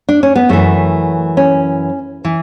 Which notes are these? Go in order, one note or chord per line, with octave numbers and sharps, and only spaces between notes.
D4
C#4
B3
F#2 E3 A3
C#4
E3